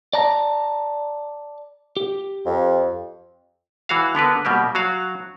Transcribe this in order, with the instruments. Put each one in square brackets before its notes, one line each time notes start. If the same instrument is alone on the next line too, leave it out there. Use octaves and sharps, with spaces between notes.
[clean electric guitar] D5 A5 A#5
G4
[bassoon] F2
[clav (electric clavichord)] E3 F#4 F5
D3 B3 A#4 B4
B2 G3 A#3 G4
F#3 F#4 F5